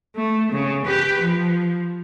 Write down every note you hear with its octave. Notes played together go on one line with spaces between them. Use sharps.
A3
C#3
G4 B4
F3